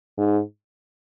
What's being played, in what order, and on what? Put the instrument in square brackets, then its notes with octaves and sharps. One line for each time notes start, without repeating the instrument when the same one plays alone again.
[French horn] G#2